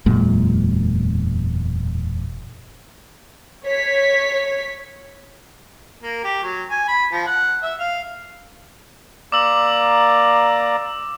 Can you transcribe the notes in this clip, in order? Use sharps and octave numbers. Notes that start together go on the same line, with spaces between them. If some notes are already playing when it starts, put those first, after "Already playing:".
E1 F#2 A#2 G#3
C#5 B6
A#3
G4
F#3
G#5
B5
F3
F#5
E5
F5
A#3 D5 A#5 D6 E6 F#7